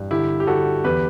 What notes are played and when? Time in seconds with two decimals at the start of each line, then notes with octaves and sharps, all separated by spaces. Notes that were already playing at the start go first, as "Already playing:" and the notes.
Already playing: G2 E3
0.11 D3 E4 G4
0.40 G4
0.47 D3 F#4 A4
0.84 E2 G4 B4